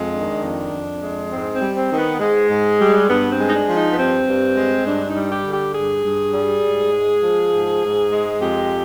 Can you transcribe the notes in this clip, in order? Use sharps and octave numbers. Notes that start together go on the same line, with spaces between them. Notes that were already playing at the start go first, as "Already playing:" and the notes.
Already playing: F2 G#3
D#3 D4
F2
F2
G#3
G#2 C4
C4
G3
C4
D#3
B3
G#2 G#3
G#2
G3
G2 B3
C4
G#3
D#4
D4
F3
D#4
B3
G2 C4
G2
G#3
G2 D4
D#4
G3
G4
D3
G4
G2 G#4
G2
G3
G#2
G#3
F3
G#2
G#2
G#3
F2 G4